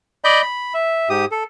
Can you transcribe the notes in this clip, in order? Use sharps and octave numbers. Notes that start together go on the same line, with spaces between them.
D5 D#5 B5 G6
B5
E5
G#2 G4 D#6
A4